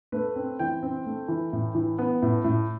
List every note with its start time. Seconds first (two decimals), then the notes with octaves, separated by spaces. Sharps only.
0.12 A3 B4
0.36 C4
0.59 E3 G5
0.83 C4
1.06 A3
1.28 E3
1.53 A2
1.75 E3
1.99 B3
2.22 A2
2.44 A2